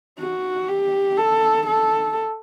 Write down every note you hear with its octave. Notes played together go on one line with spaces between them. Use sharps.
F#4
G4
A4
A4